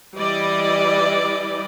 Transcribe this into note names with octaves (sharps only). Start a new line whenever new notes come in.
E3 G3 E4 D5 D#5